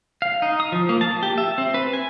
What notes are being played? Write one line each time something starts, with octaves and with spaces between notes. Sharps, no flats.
F5
D#4
D#6
F3
A#3
A5
G4
E5
C4
B4
G#5